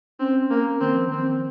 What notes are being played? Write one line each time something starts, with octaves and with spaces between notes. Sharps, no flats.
C4 C#4
A#3
D#3 C4
F3
D#3 C4